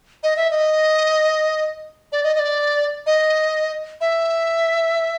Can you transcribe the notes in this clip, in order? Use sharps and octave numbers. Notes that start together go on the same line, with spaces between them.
D#5
E5
D#5
D5
D#5
D#5
D5
D#5
E5